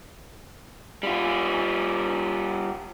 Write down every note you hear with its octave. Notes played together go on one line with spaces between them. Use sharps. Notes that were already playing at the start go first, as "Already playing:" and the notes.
G3 F4